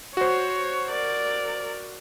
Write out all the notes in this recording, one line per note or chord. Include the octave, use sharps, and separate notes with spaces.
F#4 C5 C#5
A#4 D5